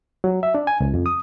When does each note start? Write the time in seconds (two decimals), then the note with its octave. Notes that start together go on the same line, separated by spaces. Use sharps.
0.24 F#3
0.43 E5
0.55 D4
0.67 G#5
0.80 C#2
0.94 F2
1.06 D#6